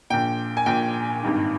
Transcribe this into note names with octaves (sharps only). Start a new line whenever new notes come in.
A#1 A#2 G5
G#5
A#1 A#2 G5
G#1 G2 D#3